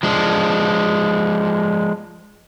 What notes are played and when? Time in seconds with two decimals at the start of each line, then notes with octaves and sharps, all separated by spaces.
0.03 F3 G#3 D4